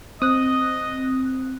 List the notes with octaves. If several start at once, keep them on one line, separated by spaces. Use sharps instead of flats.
C4 D#5 D#6 F#6